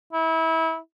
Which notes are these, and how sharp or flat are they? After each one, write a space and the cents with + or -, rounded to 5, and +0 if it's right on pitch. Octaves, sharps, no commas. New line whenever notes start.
E4 -25